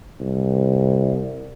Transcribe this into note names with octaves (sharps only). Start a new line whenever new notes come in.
C2